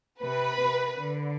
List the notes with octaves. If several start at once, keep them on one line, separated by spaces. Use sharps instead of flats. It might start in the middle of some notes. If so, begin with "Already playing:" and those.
C3 B4
C3
D3